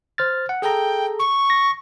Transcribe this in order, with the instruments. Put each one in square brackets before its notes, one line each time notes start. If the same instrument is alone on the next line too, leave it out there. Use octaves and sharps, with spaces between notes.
[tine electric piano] C5 F6 A6
F#5
[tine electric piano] G#4 A4 A#5 [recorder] G5
[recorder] C#6
[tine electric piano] A#6